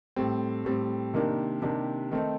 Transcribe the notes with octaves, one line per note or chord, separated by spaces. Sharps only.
A2 G3 C4
A2 G3 C4
C3 D#3 A#3 D4 G4
C3 D#3 A#3 D4 G4
D#3 A3 C4 D#4